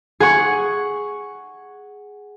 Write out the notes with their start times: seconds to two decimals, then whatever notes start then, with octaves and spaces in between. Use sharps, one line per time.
0.20 G#4 F#5 C#6